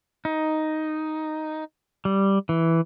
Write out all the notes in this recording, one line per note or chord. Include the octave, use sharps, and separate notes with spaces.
D#4
G3
E3